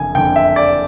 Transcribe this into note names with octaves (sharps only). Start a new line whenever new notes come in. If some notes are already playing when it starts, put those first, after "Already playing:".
Already playing: F#1 F2 D3 G#5
F#1 F2 D3 G5
E5
D5